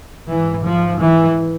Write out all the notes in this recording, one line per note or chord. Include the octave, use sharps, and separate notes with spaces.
G#1 G#2 E3
F3
E3